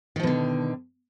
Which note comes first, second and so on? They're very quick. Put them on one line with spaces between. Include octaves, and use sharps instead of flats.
D#3 F3 B2 D3